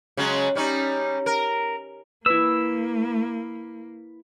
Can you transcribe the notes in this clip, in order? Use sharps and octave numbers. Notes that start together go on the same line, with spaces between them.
C#3 F#3 G#3
G3 C#4 D#4
A#4
A#3 E4 B4 E6